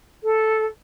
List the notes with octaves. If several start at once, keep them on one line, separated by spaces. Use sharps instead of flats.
A4